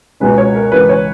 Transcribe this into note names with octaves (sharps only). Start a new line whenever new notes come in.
C#2 B2 G#3 C#4 B4
C#5
A#4
C#2 C#3 E3 B4
C#5